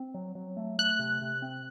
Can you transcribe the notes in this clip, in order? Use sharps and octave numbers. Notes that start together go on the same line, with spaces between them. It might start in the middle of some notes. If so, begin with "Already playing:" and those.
Already playing: C4
F#3
F#3
A3
A3 F#6
C3
C3
C4